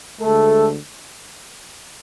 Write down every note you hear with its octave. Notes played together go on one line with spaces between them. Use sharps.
D2 D3 G#3 A3 A4